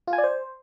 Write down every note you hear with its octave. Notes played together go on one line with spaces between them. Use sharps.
F4
G#5
D5
C5